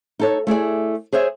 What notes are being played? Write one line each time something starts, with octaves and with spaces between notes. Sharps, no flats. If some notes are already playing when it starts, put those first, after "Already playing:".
D#4 A4 C#5
A3 E4 G#4 D5
G#4 C5 C#5 E5